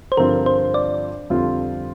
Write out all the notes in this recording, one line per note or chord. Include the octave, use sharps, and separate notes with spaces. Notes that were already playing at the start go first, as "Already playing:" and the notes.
C5
G2 D3 F3 C4 F4 A#4
C5
D5
F2 D3 G3 C4 F4